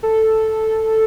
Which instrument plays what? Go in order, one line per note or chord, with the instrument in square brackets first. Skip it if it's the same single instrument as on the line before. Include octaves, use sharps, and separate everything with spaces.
[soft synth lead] A4